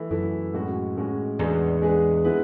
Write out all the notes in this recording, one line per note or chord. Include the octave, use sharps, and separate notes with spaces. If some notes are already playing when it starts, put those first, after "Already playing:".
Already playing: E3 A3 E4 A4
F#2 E3 A3 E4 A4
A2 G#3 C#4 F#4
A2 G#3 C#4 F#4
E2 G#3 D4 G#4 B4
G#3 D4 G#4 B4
G#3 B3 E4 B4